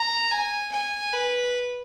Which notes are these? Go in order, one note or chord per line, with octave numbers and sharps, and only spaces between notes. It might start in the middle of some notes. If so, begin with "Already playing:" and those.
Already playing: A#5
G#5
G#5
B4